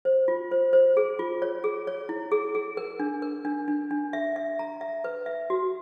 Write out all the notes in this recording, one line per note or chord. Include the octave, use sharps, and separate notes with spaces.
C5
F4
C5
C5
G#4
F4
C#5
G#4
C#5
E4
G#4
G#4
A#4
D4
A#4
D4
D4
D4
E5
E5
A#5
E5
B4
E5
F#4